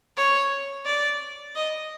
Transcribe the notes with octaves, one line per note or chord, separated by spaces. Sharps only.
C#5
D5
D#5